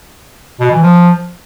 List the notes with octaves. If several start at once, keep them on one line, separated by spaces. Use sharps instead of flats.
B2
E3
F3